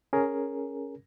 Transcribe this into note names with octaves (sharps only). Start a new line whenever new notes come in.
C#4 G#4 A#4